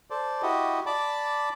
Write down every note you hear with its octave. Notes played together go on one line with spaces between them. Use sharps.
A4 C5 D5
E4 F#4 G4 D#5
D5 A5 B5 D6